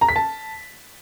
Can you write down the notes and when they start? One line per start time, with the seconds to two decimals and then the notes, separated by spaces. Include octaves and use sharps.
0.01 A#5
0.09 B6
0.16 A5